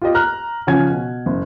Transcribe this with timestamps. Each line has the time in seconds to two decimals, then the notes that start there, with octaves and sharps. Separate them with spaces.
0.02 F4 G4 D#5
0.15 A#5 F6 F#6
0.67 C#3 F3 C#4 G#5 G#6
0.89 B2
1.26 F#1